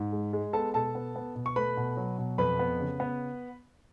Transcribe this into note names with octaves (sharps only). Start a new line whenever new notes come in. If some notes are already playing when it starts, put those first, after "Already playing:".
Already playing: G#2
G#3
G#3
B3 A4 A5
B2 A4 A5
B3
B3
B2
C#6
A3 B4 B5
B2
F#3
B2
F2 B4 B5
B3
C#3
B3